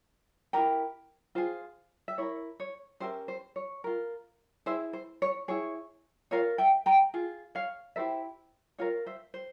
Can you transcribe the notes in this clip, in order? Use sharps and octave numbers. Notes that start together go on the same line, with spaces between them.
E4 G4 A#4 G5 A#5
F4 G#4 C5
E5
E4 A#4 C#5
C#5
C#4 G4 A#4 C5 E5
C5
C#5
F4 A#4
E4 G#4 C5 E5
C5
C#5
E4 G#4 C#5
F4 A#4 C#5 F5
E5 G5
G5 A#5
F4 G#4
C#5 F5
E4 G4 A#4 C5 E5
F4 A#4 C#5 F5
C5 E5
C5